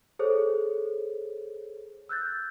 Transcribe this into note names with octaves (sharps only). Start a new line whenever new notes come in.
G#4 A4 C5 C#5
E6 F#6 G6 A6